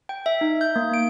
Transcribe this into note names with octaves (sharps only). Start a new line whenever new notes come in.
G5
E5
D#4
G6
A#3
D7